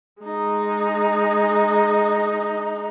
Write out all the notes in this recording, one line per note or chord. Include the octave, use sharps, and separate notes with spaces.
G#3 D#4